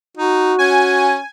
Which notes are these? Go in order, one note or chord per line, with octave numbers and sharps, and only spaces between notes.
D#4 F#4
C#4 G#5